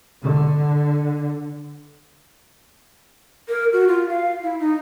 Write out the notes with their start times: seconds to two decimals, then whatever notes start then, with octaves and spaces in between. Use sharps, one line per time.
0.23 D3
3.49 A#4
3.73 F#4
3.88 F4
4.09 F5
4.43 E4
4.60 D#4